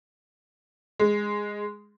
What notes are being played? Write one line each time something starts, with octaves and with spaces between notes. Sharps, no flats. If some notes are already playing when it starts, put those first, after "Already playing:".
G#3